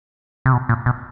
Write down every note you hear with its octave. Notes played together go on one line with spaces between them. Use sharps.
C3
B2
A#2
B2